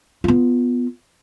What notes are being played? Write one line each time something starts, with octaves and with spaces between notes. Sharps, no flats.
B3 F4